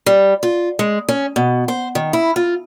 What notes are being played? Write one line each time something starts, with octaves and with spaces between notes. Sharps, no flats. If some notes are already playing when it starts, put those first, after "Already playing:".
G3
F4
G#3
C#4
B2
C5
D#3
E4
F4